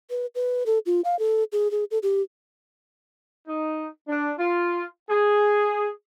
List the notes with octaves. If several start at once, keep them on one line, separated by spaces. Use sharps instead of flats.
B4
B4
A4
F4
F5
A4
G#4
G#4
A4
G4
D#4
D4
F4
G#4